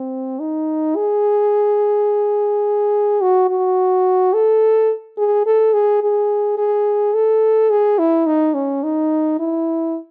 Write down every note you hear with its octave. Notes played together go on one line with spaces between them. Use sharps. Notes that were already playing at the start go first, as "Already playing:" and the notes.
Already playing: C4
D#4
G#4
F#4
F#4
A4
G#4
A4
G#4
G#4
G#4
A4
G#4
E4
D#4
C#4
D#4
E4